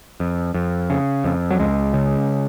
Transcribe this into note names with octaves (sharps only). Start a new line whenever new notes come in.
F2
F2
C#3
F2
F#3
C#2 G#3
C#3